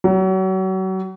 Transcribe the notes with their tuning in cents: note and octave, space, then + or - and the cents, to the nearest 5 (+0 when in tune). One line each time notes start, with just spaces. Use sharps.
F#3 +35